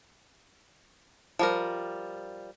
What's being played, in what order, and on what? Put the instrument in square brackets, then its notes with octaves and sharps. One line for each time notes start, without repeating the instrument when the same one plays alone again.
[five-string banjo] F3 G3 A#4